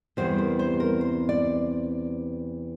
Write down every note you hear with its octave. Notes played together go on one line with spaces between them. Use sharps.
E2 C3 E3 G3 C5
A#4
C5
A#4
C5
D5